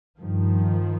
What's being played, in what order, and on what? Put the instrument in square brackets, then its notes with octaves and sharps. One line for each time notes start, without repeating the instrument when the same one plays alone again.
[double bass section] G2 D#3 F3